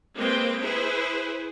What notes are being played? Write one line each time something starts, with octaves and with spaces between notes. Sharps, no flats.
G#3 A#3 C4 B4 G5
E4 G#4 B4 C5